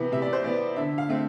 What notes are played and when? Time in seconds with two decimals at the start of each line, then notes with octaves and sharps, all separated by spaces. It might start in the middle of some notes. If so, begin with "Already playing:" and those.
Already playing: C3 E3 B3
0.12 C3 E5
0.22 D5
0.33 C5
0.44 E3 B3 D5
0.76 D3 E5
0.98 F5
1.09 A3 C4